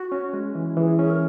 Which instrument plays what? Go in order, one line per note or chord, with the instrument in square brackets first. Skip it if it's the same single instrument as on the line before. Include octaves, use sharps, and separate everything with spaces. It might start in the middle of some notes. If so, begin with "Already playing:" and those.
Already playing: [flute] F#4
[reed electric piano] C#4
G#3
E3
[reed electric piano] E3 [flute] G#4
[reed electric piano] C#4 [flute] G#4
[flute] A#4